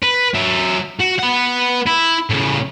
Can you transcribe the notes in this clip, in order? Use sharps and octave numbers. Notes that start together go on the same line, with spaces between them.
B4
F#3 E5
F#4
B4 F#5
E4
A2 C#3